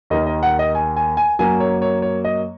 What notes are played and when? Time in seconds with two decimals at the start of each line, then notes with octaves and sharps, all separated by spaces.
0.10 D#2 D#3 A#3 D#5
0.26 D#5
0.43 F#5
0.59 D#5
0.75 G#5
0.97 G#5
1.17 G#5
1.39 F#2 F#3 A#3 G#5
1.60 C#5
1.82 C#5
2.02 C#5
2.25 D#5